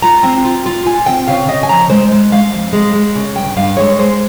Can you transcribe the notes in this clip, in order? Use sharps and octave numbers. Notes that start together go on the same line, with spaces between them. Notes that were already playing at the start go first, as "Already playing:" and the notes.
F4 A#5
C4
F4
F4
F4 G#5
C4 G5
C#3 F5
C#3 D#5
G#5
F3 A#5
G#3 C5
G#3
G#3 F5
F2
G#3
G#3
C#3
G2 G5
G2 F5
G#3 C#5
G#3 C5